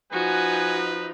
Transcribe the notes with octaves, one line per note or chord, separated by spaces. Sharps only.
F3 D#4 F#4 B4 G#5